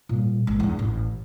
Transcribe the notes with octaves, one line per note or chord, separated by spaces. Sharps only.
A#2 G3
A#1 G#3
E2 D3
A1